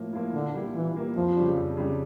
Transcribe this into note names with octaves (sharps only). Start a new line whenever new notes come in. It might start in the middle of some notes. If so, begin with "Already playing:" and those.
Already playing: A2 F3 A#3 E4
F3 A#3 E4
A#2 D3
G3 A#3 E4
A#2 E3
G3 A#3 E4
F2 F3
C#3 G3 D4
F2
C#3 G3 D4